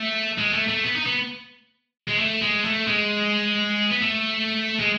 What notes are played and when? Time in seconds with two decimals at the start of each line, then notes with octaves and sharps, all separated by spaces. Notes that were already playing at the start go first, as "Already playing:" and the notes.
Already playing: A3
0.38 G#3
0.53 A3
0.68 A3
0.85 B3
0.96 D#4
1.06 B3
2.08 G#3
2.19 A3
2.42 G#3
2.64 A3
2.87 G#3
3.91 B3
4.00 A3
4.80 G#3